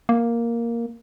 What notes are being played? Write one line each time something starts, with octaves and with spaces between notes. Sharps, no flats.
A#3